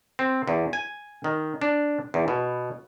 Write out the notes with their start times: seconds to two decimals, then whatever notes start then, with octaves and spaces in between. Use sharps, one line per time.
0.19 C4
0.48 E2
0.73 G#5
1.24 D#3
1.61 D4
2.14 E2
2.28 B2